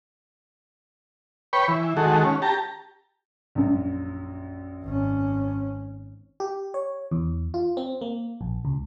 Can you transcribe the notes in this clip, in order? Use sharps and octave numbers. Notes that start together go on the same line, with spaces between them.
B4 C#5 G5 B5 C#6
E3
D#3 G#3 F#4 A4
C#4
G4 A5 A#5
A#1 F#2
G#1 C#4
G4
C#5
E2
F4
C4
A#3
A#1
C#2